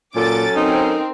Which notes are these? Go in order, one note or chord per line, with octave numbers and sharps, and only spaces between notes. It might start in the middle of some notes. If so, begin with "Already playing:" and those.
A#2 F#3 C#4 A4 D6 A6
C4 D#4 A#4